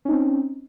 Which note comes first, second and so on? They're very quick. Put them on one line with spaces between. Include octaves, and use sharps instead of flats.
C#4 D#4 C4